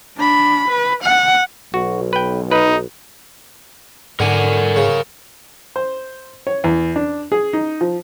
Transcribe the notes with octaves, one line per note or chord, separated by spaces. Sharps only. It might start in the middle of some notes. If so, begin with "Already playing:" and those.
D4 B5
B4
F#5
B1 F#4
B4 G5
D#4 B4
G#2 D3 A#4 F#5 G#5
C#3
C5
C#5
E2
D4
G#4
D#4
F3